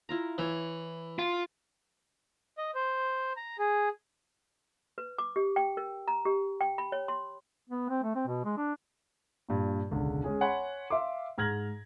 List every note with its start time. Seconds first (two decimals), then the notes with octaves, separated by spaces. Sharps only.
0.09 E4 F4 A#5
0.38 E3 E4 C#5
1.19 F4
2.58 D#5
2.75 C5
3.37 A#5
3.59 G#4
4.98 B4
5.18 D6
5.36 G4
5.56 G5
5.77 A#4
6.08 A#5
6.25 G4
6.61 G5
6.78 B5
6.92 C#5
7.08 C6
7.69 B3
7.89 C4
8.03 A3
8.15 C4
8.27 B2
8.45 G#3
8.57 D4
9.49 G2 A#2
9.90 E1 C#2 D3
10.24 G#3 C#4 G#4
10.41 C#5 F#5 G#5 B5 C6
10.90 E5 F5 C6 D6
11.38 G#2 A#5 F6 G#6 A#6 F#7